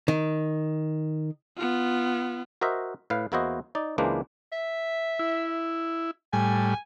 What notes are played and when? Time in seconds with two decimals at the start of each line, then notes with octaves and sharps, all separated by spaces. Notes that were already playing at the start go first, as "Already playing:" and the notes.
0.08 D#3
1.57 B3 F4
2.61 F#4 A#4 C5 D#5 E5
3.10 A2 B4 F5
3.32 E2 A#3 E4 F#4 C5 D#5
3.75 D#4 D5
3.98 C#2 E3 G#3 A#3 D4 C5
4.53 E5
5.19 E4
6.33 A2 G3 G#5